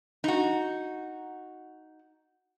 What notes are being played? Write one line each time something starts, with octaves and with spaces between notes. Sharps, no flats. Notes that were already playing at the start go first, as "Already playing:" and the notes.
D#4 F#4